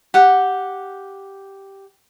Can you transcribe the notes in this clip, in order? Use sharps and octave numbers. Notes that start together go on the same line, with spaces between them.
G4 F#5